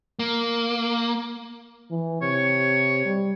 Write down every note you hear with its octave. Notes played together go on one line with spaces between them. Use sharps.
A#3
E3
C3 C#5
G3